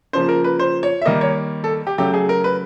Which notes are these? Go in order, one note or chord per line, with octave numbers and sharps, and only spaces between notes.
C#3 F3 A#3 C5
A#4
B4
C5
C#5
E5
D#3 G3 A#3 D#5
C#5
A4
G4
C#3 F#3 A3 G4
G#4
A#4
B4